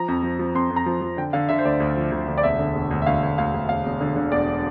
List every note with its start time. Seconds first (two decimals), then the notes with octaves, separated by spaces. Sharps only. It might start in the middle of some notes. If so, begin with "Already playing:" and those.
Already playing: F3 A#5
0.08 F2
0.23 F3
0.39 F3
0.55 F2 C6
0.71 F2
0.76 A#5
0.86 F3
1.01 F3
1.17 D3 G5
1.33 D3 F5
1.49 D3 E5
1.58 C5
1.65 D2 D5
1.80 D2
1.96 F3
2.12 D2
2.28 D2
2.38 D5
2.43 E1 E5
2.59 D3
2.75 E1
2.91 D2
3.02 E5
3.06 D2 F5
3.23 D2
3.38 D2 F5
3.54 D2
3.69 E1 F5
3.85 E1
4.01 D3
4.16 D3
4.32 E1 D5